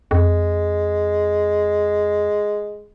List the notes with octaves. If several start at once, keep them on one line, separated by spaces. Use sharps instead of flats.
F2 G#3